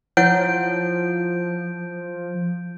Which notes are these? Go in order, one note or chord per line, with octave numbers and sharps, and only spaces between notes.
F3 E4 C#5 F#5 G6 D7